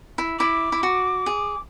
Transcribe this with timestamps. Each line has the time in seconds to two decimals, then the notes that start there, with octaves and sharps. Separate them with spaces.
0.18 E4
0.39 E4 D6
0.72 E4
0.83 F#4
1.26 G#4